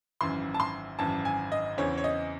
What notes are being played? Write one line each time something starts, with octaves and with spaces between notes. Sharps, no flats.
G#1 F#2 E3 C6
A5
C6
G#1 F#2 E3 A5
G#5
D#5
E2 C#3 E3 C4 C#5
C#5
D#5